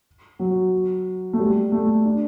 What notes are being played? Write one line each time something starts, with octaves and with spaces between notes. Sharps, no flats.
F#3
A3
G3
A3
D4